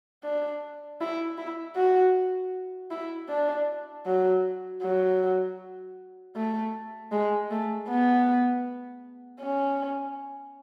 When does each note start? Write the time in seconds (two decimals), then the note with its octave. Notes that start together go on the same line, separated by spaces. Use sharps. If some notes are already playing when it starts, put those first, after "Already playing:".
0.24 D4
1.01 E4
1.38 E4
1.76 F#4
2.91 E4
3.29 D4
4.06 F#3
4.82 F#3
6.36 A3
7.12 G#3
7.51 A3
7.88 B3
9.41 C#4